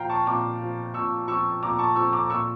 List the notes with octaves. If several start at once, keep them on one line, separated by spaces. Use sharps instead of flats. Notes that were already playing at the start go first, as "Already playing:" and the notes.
Already playing: A#2 F3 F5 G5 A#5
A5 C#6
A#2 A#5 D6
F3
A#2 C#6 E6
F3 C#6 E6
A#2 A#5 D6
A5 C#6
F3 C#6 E6
A#5 D6
A#2 C#6 E6